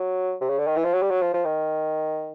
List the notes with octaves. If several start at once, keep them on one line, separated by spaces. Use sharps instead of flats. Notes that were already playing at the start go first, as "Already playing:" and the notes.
Already playing: F#3
C3
C#3
D3
D#3
E3
F3
F#3
G3
F#3
F3
F3
D#3